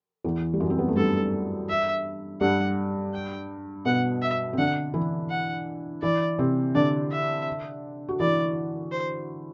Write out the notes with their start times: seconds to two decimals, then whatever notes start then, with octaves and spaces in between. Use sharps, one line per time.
0.24 E2 E3
0.54 G3
0.60 F#2 F#3
0.70 C4
0.79 B3
0.88 A3
0.96 G2 G3 A4
1.69 E5
2.41 G2 G3 F#5
3.14 G5
3.85 B2 B3 F#5
4.22 E5
4.53 C4
4.58 D3 D4 F#5
4.94 E3 E4
5.30 F#5
6.02 E3 E4 D5
6.39 C3 C4
6.75 D3 D4 D5
7.11 E5
8.09 F#4
8.20 E3 E4 D5
8.92 C5